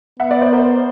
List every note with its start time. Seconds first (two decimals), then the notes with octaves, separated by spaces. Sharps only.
0.19 B3 E5 F#5
0.31 D5 E5
0.41 C5 D5
0.53 A#4 C5